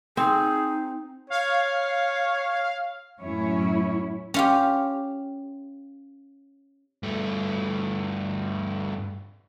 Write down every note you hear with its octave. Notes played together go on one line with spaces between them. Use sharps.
C4 D#4 G#4
C#5 F5
F#2 A2 F#3 C#4 E4 C#5
C#4 F4 G4
G2 A3